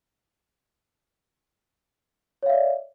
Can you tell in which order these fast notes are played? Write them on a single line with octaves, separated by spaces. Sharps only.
C#5 F5 E5 D5